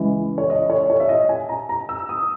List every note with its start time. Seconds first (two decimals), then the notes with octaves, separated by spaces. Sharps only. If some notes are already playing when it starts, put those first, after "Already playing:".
Already playing: C#2 C#3 E3 G#3
0.38 C#5
0.50 D#5
0.70 C#5
0.90 C#5
1.00 E5
1.09 D#5
1.29 G#5
1.49 A#5
1.69 A#5
1.89 E6
2.09 D#6